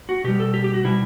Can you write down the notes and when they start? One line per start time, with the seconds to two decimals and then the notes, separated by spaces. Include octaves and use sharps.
0.09 F#4
0.24 B2 G3 G4
0.40 A4
0.54 G4
0.64 G4
0.74 F#4
0.84 B2 G3 E4